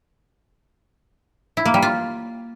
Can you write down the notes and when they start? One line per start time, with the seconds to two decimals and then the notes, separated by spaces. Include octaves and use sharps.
1.57 E4
1.65 A#3
1.74 G3
1.82 F4